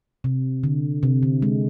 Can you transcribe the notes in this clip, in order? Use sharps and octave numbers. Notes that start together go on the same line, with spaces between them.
C3
D3
C3
D3
G#3